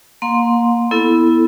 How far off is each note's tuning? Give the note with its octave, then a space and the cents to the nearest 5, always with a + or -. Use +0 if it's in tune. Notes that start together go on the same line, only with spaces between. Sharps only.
A#3 +0 F5 +45 C6 +0
B3 -5 E4 +0 A4 +0